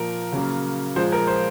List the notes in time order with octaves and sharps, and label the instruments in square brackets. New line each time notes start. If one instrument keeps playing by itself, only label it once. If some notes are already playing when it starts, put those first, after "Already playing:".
Already playing: [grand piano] A#2 F3 A#3 A#4
C#3 F#3 A#3
A#2 F3 G#3 C5
A#4
C5